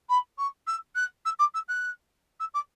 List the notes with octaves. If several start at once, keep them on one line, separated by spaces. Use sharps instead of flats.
B5
C#6
E6
F#6
E6
D6
E6
F#6
E6
D6